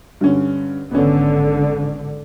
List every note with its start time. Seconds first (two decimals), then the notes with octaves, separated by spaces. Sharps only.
0.21 G2 D3 C#4
0.91 G#1 D3 B3 C#4